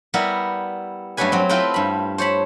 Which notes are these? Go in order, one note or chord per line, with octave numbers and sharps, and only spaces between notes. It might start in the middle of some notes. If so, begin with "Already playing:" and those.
G3 B3 E4 A#4
G2 F#3 A3 C#4 B4 G#5
F#3 C4
C4 E4 F4 A4 B4 G5
G2 B5
C5 C#5 A5 B5